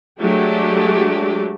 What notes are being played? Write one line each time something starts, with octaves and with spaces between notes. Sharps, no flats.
F#3 G#3 A3 D4 G4